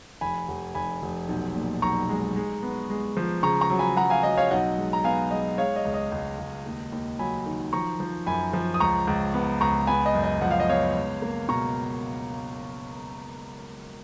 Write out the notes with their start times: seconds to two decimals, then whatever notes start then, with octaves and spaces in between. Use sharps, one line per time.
0.21 F1 G#5 B5
0.48 F1
0.75 F1 G#5 B5
1.02 F1
1.29 B1
1.55 A#2
1.82 B1 A#5 C#6
2.09 G#3
2.36 G#3
2.63 B3
2.90 G#3
3.17 F3
3.43 C#3 A#5 C#6
3.61 A#5 C#6
3.70 F#3
3.79 G#5 B5
3.97 F#3 F#5 A#5
4.10 F5 G#5
4.23 F#3 D#5
4.37 C#5 F5
4.51 B1 D#5 F#5
4.78 G#3
4.93 A#5
5.04 B3 F5 G#5
5.31 G#3 D#5
5.58 G#3 C#5 F5
5.76 D#5
5.85 C#2
5.94 D#5
6.12 C#2
6.39 C#2
6.66 D#2
6.92 D#2
7.19 F#3 G#5 B5
7.46 D#3
7.73 F3 A#5 C#6
8.00 F3
8.26 F#2 G#5 B5
8.53 F3
8.74 D#6
8.80 C#2 A#5 C#6
9.07 C#2
9.34 B3
9.61 C#2 A#5 C#6
9.87 B3 G#5 B5
10.06 D#5
10.15 F#2
10.23 D#5
10.41 F3 F#5
10.51 F5
10.60 D#5
10.68 B3 C#5 F5
10.95 C#2
11.22 A#3
11.48 B2 A#5 C#6